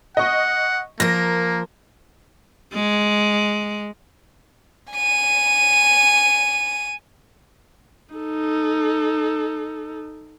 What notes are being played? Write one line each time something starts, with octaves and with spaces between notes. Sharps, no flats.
D#5 F#5 C#6
F3 A#3 A#4 A#6
G#3
G#5 D#7
D#4 A4